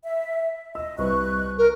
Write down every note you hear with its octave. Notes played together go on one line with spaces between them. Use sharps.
E5
D#5 E6
C2 B4 C#6 F#6
A#4